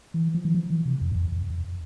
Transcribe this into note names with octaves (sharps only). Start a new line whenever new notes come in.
E3
F3
E3
F3
E3
C3
F2
G#2
F2
F2
F2